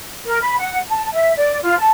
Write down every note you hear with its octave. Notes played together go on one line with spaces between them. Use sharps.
A#4
B5
F#5
A5
E5
D5
F4
A5